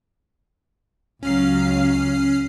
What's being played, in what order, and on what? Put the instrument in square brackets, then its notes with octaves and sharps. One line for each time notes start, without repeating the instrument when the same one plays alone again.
[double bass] C#2 [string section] F#3 F5 [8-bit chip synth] C#4 F6 C7